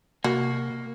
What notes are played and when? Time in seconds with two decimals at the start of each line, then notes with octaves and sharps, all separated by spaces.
0.24 C3 A#3 F#4